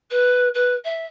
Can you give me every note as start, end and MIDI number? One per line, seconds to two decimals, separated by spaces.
0.10 0.48 71
0.54 0.73 71
0.84 1.05 76